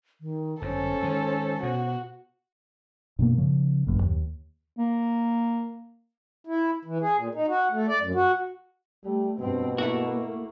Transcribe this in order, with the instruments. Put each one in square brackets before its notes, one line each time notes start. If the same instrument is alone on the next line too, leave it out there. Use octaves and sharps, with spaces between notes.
[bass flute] D#3
[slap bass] G1 F#2 [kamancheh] C#4 A4 [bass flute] C5
[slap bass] D#3 G#3
[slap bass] B2 [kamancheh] F#4
[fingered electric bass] G2 B2 A#3
C#3 F3
E1 A1 F#2 A#2
D#2
[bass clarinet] A#3
[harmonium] E4
E3
G#4
A#2
D#4
F#4
A3
D5
F#2
F#4
[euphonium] G3 [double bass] A3
[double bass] G2 C4 [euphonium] B2
[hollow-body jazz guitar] A3 E4 F#4 [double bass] A#3